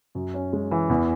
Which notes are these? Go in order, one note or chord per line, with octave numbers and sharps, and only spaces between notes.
F#2
C#4
G#3
E3
E2